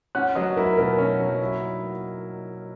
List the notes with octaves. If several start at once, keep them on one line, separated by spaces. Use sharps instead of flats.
C#4 F#5 F#6
F#3 D#5 D#6
E4 A#4 A#5
B2 A#4 A#5
C#4
F#3
E4